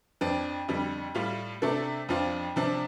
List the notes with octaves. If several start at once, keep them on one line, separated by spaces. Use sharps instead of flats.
F2 F3 D4
F2 D3 G3
A2 G3 F4
C3 A3 D4 A4
F2 F3 D4 F4
C3 F3 D4